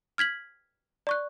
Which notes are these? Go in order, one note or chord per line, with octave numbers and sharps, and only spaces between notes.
F6 G#6 B6 F#7
D5 C#6 F#6